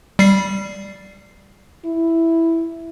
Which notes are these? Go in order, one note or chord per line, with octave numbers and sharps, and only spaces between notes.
G3 C7
E4